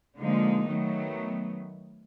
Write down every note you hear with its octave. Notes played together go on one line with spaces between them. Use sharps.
D3 F3 G#3 A#3 D#4
D#3 F#3 A3 B3